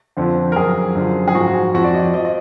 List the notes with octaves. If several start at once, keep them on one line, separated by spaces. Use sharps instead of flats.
F2 D3 F3
A#4
F#2 F3 G#4
F#2 D3 F3
G#4
G#2 F3 F#4
F2 F3 F#4
D5
D#5
F3 D#5
D#5